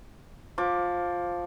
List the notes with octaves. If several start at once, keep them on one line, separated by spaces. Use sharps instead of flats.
F3 D6